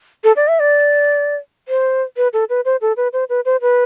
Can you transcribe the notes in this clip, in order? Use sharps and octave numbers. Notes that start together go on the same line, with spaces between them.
A4
D5
E5
D5
C5
B4
A4
B4
C5
A4
B4
C5
B4
C5
B4